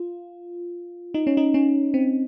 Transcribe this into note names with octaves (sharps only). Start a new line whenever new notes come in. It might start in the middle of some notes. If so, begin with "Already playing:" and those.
Already playing: F4
D#4
C#4
D#4
C#4
C4